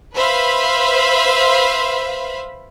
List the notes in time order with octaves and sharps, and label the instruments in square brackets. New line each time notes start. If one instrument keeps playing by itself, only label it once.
[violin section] B4 C5 E5 F5 B5